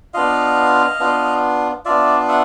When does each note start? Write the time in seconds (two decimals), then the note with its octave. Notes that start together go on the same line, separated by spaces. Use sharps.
0.14 B3 D4 F4 D#5 F5
1.00 B3 D4 F4
1.85 B3 D4 F4 D5 E5
2.28 E5 F#5